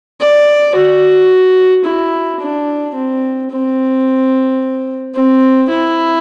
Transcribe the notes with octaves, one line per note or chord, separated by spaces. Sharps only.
D5
F#4
E4
D4
C4
C4
C4
E4